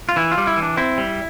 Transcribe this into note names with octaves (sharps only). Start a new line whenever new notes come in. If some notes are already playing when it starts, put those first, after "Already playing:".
F4
E3 E4
F4
G3
E4
E3
D4
C4 E4
G3